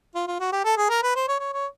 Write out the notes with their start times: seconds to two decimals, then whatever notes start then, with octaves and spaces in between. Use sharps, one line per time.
0.15 F4
0.27 F4
0.40 F#4
0.52 G4
0.64 A4
0.77 G#4
0.89 A#4
1.03 B4
1.16 C5
1.28 C#5
1.40 C#5
1.53 C#5